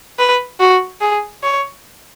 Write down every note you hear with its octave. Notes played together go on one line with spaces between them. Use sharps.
B4
F#4
G#4
C#5